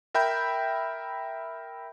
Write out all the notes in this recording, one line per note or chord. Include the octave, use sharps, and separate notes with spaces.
A#4 E5 G5 B5 G6